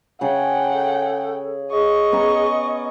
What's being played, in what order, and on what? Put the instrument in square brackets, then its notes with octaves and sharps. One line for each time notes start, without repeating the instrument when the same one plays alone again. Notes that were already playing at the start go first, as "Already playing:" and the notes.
[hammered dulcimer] C#3 G#4 [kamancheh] F#5 G5
[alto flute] A4
[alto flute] G#4 [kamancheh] D#5 C#6
[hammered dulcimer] B3 C#4 A#5